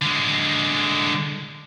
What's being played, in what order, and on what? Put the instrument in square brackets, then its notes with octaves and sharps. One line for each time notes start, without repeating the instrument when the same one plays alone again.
[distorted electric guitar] D3 G#3